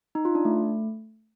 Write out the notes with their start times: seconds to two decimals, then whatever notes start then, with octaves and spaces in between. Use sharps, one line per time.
0.15 D#4
0.25 F4
0.35 D4
0.45 A3